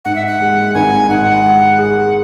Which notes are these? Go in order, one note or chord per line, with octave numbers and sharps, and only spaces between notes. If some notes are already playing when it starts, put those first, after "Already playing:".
G#2 F#5
E5
F#5
G#3
G#1 G#5
G#2 F#5
G#3
G#4